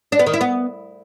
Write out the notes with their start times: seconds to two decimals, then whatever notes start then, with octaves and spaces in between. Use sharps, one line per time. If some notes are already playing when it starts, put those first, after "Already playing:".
0.12 D4
0.19 B3
0.26 D#3
0.34 E4
0.41 B3